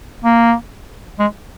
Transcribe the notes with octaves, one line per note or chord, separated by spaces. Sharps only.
A#3
G#3